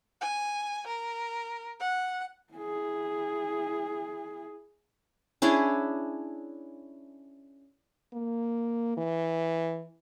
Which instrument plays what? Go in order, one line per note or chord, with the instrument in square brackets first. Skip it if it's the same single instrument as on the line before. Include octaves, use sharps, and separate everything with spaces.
[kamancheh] G#5
A#4
F#5
[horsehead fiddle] E4 G#4
[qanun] C#4 D4 E4 G#4
[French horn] A#3
E3